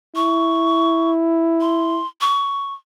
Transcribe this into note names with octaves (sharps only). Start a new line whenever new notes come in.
E4 C#6
C6
C#6